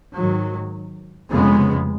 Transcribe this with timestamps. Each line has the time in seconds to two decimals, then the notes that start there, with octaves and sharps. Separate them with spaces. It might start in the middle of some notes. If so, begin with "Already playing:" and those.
0.15 G#2 D#3 F#3
1.31 F1 F2 C#3 G#3 B3